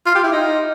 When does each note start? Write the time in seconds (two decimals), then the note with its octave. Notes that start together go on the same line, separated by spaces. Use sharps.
0.06 F4
0.15 G4
0.24 E4
0.32 D#4